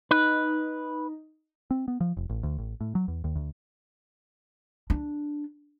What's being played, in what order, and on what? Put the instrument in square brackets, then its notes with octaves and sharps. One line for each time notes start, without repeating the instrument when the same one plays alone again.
[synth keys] D#4 [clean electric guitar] B4
[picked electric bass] C4
B3
F3
F1
A1
D2
A1
A2
F#3
E2
D#2
D2
[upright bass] D4